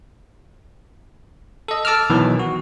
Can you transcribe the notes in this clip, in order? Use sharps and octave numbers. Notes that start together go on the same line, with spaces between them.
A4 D#5
A4 A5 D6 E6 F6
B2 D#3 E3 F#3
F#4